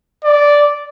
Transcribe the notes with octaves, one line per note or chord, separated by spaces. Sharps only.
D5